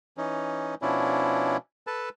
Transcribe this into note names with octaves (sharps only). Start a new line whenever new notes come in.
E3 C#4 D#4
B2 F3 C#4 D4 E4
A4 B4 A5